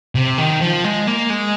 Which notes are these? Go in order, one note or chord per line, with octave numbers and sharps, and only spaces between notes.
C3
D#3
F3
G#3
A#3
G#3